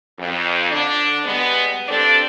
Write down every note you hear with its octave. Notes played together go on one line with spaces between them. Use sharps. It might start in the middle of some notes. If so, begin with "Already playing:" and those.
F2
D3 D4
G3 G#3 B3
G2 C4 D4 A4 D5